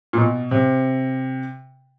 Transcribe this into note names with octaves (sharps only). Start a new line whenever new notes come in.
A#2
B2
C3